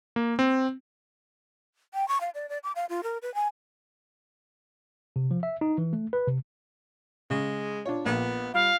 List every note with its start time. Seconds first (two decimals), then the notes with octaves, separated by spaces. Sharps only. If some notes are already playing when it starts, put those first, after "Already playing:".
0.16 A#3
0.39 C4
1.94 G5
2.08 C#6
2.21 F5
2.35 D5
2.49 D5
2.63 D6
2.75 F5
2.89 F4
3.03 A#4
3.22 B4
3.35 G#5
5.16 C3
5.31 F3
5.43 E5
5.61 D#4
5.78 E3
5.93 A3
6.13 B4
6.28 C3
7.30 C#3 G#3
7.85 D4 F4 C#5
8.06 A#1 A#3 B3
8.54 G3 F4 F5